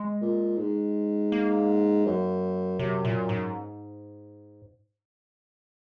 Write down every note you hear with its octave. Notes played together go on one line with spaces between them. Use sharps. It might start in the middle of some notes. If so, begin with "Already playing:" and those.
Already playing: G#3
A#2
G#2
A#3
F#2
F#2 C3
A#2
G#2